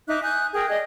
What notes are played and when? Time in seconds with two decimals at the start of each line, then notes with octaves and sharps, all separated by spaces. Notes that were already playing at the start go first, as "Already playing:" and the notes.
0.08 D#4 E5 D6 F#6
0.22 G#5 D#6 F#6 G6
0.54 G#4 A#4 G5 D#6
0.69 G#4 D5 D#5